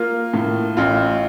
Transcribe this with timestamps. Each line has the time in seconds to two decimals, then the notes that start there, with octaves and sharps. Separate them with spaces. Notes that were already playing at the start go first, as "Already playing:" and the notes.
Already playing: A#3 F4
0.34 A2
0.77 A1 F4